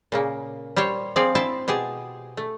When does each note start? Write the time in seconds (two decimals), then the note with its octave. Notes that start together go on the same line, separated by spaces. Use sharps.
0.12 A#2 C#3 A#3
0.76 G3 G4 C5 C#5
1.16 F3 C4 G#4 D5 F5
1.35 E4 C5 G5 A5
1.68 B2 G4 G#4 A5
2.37 A3